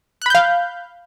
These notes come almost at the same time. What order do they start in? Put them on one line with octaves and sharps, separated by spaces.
F#6 B5 G6 F5